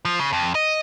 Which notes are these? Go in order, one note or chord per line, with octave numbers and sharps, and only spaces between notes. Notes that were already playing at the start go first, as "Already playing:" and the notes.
F3
C#3
F2
D#5